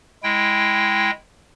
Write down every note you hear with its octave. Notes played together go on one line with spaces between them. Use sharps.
G#3 E4 G5